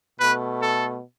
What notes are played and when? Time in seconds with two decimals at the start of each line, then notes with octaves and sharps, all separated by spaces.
0.18 B2 A3 B4
0.59 A4